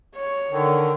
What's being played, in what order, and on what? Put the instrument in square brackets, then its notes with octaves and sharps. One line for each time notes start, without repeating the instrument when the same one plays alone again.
[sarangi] C#5
[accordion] D3 D#3